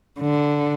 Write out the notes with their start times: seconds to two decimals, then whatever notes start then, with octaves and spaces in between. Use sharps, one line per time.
0.20 D3